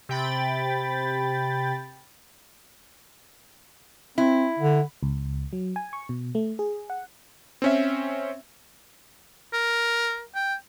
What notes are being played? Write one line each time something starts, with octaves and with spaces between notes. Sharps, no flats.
C3 G5 B5 A6
C4 E4
D3
C#2
F#3
G#5
C#6
B2
A3
G#4
F#5
C4 C#4 E5
A#4
G5